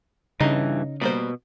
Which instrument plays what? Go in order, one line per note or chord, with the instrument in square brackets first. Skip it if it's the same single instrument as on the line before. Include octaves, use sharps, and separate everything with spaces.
[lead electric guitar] G2 E3 [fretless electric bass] C#3 [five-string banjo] D#4 D#5
[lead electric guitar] B2 [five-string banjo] G3 A#3 C5